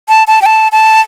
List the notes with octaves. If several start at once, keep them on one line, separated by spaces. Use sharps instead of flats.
A5
A5
G5
A5
A5